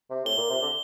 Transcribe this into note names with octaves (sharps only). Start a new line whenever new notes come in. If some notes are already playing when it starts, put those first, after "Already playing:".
C3
A2 G7
A#2
C3
D3